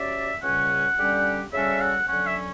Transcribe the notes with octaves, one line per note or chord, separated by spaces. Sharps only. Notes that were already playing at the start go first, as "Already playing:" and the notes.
Already playing: F#3 C#4 G4 D5 E5
C#2 C#3 G3 C#4 F#5
D3 G3 C#4 G4
C#3 G3 C#4 F#4 A4 E5
F#5
D3 F#3 C#4 F#5
E5